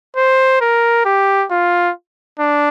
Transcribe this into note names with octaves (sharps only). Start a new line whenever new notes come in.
C5
A#4
G4
F4
D4